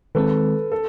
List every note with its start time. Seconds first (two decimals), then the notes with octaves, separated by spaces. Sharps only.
0.15 D#3 G#3 C4 A4 B4
0.72 A4